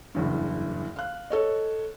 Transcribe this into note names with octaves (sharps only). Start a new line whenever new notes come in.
F#1 E2 G2
F5 F#6
A4 C#5 D#5